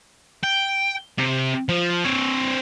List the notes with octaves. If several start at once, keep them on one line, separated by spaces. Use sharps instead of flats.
G5
C3
F3
C4 C#5